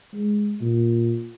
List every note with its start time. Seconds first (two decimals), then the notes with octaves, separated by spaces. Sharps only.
0.13 G#3
0.61 A#2